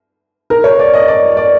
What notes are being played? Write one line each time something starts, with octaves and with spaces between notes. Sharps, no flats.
A#4
C#5
D5
D#5
D5
D5